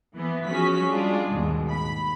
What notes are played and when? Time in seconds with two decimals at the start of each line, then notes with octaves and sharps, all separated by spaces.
0.17 E3 B3
0.47 F3 C#4 F#4 G#4 B6
0.88 G3 G#3 D4 F4 G#4
1.32 D#2 G#2 B2
1.69 B5